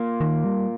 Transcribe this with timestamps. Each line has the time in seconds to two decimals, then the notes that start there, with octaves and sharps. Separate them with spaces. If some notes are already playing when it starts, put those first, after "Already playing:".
Already playing: A#2 A#3
0.21 D#3
0.45 G3